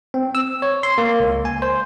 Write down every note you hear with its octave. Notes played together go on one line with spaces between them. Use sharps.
C4
E6
C#5
C6
A#3
C#2
G#5
C5